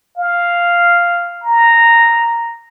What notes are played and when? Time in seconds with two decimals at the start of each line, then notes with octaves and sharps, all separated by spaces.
0.18 F5
1.44 A#5